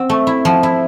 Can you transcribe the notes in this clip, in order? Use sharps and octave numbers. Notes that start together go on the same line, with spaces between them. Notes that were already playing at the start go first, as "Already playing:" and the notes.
Already playing: C4
A3
E4
F3
E4